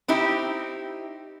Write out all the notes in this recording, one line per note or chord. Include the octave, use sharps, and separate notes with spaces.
C4 D#4 E4 G4